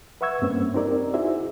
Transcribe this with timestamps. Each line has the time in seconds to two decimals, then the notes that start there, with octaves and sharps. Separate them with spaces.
0.21 B4 E5 F#5 C#6 E6 G#6
0.42 G2 A#3 C4 C#4
0.75 C4 D#4 G4 A#4 D5
1.14 D#4 E4 F#4 G#4 C5 E5